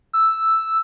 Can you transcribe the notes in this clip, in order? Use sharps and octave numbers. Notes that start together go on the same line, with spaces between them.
E6